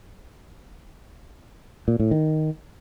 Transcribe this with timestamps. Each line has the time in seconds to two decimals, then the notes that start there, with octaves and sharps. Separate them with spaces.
1.88 A#2
2.00 A2
2.11 D#3